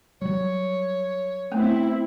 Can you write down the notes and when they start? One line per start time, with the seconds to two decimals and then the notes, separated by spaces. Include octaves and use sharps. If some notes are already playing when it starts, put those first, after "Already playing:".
0.22 F#3 G3 C#5
1.52 A3 B3 C4 E4